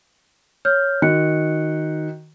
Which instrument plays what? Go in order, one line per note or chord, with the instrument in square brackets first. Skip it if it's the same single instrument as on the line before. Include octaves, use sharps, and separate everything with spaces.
[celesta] C#5 F6 G6
[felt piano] D#3 [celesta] F#4 F#6 C#7